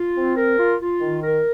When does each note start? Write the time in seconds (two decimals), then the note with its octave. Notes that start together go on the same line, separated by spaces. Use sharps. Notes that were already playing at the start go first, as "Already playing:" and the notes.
Already playing: F4
0.15 C4
0.36 A#4
0.58 F4
0.79 F4
1.01 D#3
1.23 A#4